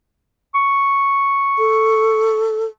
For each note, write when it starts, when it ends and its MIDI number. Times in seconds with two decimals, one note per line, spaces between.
0.54 2.50 85
1.58 2.65 69